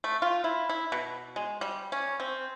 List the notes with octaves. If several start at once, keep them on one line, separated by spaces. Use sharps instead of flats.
A3
F4
E4
E4
B2
G#3
G3
C#4
C4